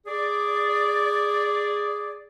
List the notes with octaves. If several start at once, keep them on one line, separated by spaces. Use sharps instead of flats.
G#4 D5